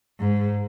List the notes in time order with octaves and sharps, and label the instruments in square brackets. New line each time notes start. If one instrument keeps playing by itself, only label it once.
[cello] G#2